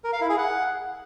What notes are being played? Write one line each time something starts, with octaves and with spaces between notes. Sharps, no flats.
A#4
F5
E4
G#4
F#5